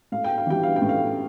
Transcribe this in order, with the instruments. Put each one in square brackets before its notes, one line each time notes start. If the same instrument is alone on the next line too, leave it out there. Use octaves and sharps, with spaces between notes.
[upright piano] A2 F5
G5
F5
E3 G3 G5
F5
G5
A2
F5